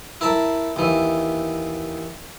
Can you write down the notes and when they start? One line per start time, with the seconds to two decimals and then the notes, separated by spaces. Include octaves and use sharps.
0.21 E4 A#4 A5
0.76 D#2 E3